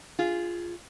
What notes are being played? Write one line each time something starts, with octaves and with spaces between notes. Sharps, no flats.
F4 G#4